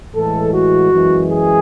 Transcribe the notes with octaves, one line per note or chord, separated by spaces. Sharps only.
A2 E3 G#3 A4
F#4
F#2 E3 G#3
G#4